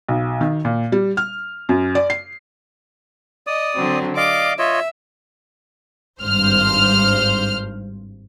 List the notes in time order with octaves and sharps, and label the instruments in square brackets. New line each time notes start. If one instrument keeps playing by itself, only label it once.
[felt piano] B1
D#3
A#2
G3
F6
F#2
D5
C7
[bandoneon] D5 D#6 [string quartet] D#5
[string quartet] D3 F#3 C4
[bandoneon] D5 D#5 F5 [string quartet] D6
[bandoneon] F4 C#5 D#5 [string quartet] E5
[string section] G#1 G2 C5 F6